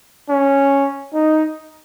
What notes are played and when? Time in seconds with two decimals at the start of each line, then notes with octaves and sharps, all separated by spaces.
0.30 C#4
1.14 D#4